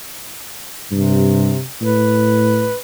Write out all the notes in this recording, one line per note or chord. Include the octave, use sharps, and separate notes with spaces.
G2 C3
A2 B4